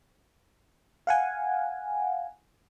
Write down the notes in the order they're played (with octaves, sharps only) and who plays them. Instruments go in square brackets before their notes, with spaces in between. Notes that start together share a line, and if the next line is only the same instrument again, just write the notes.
[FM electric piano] F5 F#5 G#5